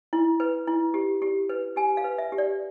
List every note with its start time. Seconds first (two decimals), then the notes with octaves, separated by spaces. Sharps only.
0.13 E4
0.40 B4
0.67 E4
0.94 G4
1.22 G4
1.49 B4
1.76 G4 G#5
1.97 F5
2.04 B4
2.18 E5
2.32 G4
2.38 D5